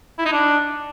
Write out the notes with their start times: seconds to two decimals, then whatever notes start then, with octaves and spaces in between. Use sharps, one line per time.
0.19 E4
0.26 D#4
0.33 D4